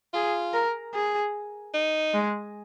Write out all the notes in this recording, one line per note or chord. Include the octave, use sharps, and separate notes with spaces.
F4 G#4
A#4
G#4
D#4
G#3